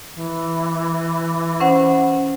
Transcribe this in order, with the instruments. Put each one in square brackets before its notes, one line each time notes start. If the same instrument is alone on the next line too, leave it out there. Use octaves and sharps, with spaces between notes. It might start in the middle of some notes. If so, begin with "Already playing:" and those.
[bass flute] E3
[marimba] C#4 C5 F#5